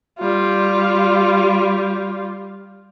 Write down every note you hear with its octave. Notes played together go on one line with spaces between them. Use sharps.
G3 F4